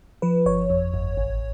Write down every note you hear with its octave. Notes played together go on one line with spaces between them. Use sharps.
F3 B4
G1 C#5
F2
G1
A1